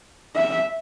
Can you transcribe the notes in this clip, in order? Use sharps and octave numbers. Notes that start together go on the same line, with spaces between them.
E5